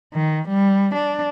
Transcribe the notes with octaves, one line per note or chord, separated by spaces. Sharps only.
D#3
G3
D4